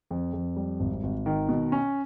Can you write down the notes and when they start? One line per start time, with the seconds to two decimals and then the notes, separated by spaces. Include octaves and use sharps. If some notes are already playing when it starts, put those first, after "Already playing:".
0.11 F2
0.33 F2
0.57 G3
0.80 G#1
1.03 G#1
1.26 D#3
1.49 B2
1.72 C#4